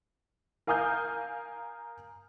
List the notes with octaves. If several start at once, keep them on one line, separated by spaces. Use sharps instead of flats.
A#4 F5 G#5 D#6 F6 G6